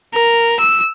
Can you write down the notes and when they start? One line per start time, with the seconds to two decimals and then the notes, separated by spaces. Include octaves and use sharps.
0.15 A#4
0.60 E6